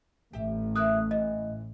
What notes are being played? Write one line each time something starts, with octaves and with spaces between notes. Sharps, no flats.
A1 A2 G4 E5
A#3 E4 E5 D#6 F#6
E3 D#5